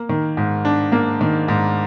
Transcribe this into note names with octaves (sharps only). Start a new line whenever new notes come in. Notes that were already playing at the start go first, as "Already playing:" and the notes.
Already playing: A#3
D#3
G#2
D4
A#3
D#3
G#2